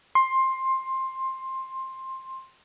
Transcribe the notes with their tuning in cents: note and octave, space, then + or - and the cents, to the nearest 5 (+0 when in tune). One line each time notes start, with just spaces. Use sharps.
C6 +15